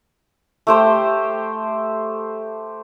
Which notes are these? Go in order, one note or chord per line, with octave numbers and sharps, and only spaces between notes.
A3 G4 C5 G5